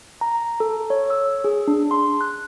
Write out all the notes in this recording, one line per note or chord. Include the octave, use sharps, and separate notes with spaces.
A#5
A4
C#5
E6
G#4
D4
C6
F#6